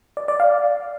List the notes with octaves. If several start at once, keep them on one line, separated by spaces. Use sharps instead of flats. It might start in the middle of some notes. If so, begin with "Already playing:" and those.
D5
D5
F5